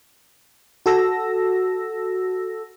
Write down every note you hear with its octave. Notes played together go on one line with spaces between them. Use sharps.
F#4 A4 E6 A#6